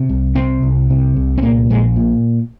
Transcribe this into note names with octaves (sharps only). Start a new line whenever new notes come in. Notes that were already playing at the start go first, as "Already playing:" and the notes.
Already playing: C3
C2
C3 C4
C2
C3
C2
C4
A#2 A#3
A#1 G#3
A#2